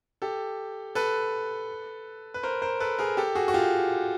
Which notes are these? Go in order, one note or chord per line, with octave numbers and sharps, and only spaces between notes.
G4 A4
A4 B4
B4
A#4 C5
A#4 C5
A4 B4
G#4 A#4
G4 A4
F#4 G#4
F#4
F4 G4